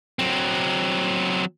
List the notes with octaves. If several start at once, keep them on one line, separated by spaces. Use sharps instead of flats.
F#3 C4